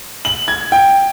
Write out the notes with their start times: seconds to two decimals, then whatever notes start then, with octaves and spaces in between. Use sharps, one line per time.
0.25 F#7
0.48 G#6
0.72 G5